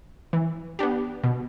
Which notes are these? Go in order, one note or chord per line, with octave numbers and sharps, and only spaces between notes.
E3
B3 D4 G4
B2